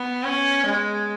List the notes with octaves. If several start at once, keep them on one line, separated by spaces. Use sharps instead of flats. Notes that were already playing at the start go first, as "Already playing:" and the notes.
Already playing: B3
C#4
G#3